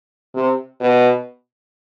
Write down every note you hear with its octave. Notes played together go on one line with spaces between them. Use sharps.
C3
B2